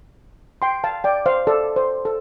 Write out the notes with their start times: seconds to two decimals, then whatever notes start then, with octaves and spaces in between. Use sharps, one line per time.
0.62 G5 C6
0.84 F5 A5
1.04 D5 G5
1.26 C5 F5
1.47 A4 D5
1.76 C5
2.05 A4